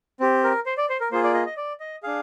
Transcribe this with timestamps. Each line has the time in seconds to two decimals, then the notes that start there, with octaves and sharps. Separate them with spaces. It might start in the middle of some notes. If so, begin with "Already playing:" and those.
0.20 C4 G4
0.44 A#4
0.66 C5
0.77 D5
0.89 C5
1.00 A#4
1.11 A#3 F4 G#4 C5
1.24 D5
1.34 D#5
1.46 D#5
1.57 D5
1.80 D#5
2.03 D4 G#4 F5